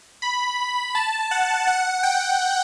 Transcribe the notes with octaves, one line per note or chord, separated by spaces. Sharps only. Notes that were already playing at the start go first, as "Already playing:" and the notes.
B5
A5
F#5
F#5
G5